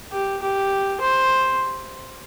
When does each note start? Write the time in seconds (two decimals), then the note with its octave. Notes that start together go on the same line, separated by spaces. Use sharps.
0.12 G4
0.42 G4
1.01 C5